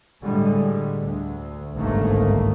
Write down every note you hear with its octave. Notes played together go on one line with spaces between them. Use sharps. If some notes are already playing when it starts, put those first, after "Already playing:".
A2 D3 G3 G#3
D2
G1 C2 G#2 D#3 A3 A#3